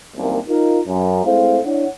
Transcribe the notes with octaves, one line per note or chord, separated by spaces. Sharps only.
C2 F#2 C3 D#3 A#3
D#4 F4 A#4
F#2
G#3 A3 C4 E4 C5 F5
D4 E4 C#5 F#5